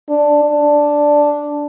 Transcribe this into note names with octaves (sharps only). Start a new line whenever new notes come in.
D4
D4